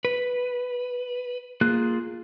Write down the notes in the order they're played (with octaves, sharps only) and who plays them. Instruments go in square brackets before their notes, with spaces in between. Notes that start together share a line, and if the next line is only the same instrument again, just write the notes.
[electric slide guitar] B4
[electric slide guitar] A#3 [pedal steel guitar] F4 G#4 F#6